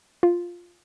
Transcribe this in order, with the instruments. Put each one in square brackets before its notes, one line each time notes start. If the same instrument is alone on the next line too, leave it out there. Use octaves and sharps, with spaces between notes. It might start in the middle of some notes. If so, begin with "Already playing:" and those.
[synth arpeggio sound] F4